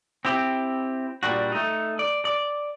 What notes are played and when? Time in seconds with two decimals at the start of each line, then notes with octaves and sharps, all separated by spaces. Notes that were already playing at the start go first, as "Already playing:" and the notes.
0.25 C4 E4 G4
1.23 A#2 G3 D4 F#4
1.52 A3 D#4
1.99 D5
2.25 D5